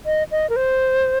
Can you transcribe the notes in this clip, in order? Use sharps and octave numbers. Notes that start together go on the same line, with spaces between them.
D#5
D#5
A#4
C5